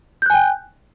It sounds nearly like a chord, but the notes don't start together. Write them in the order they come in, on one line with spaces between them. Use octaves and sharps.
G6 F#6 G#5 G5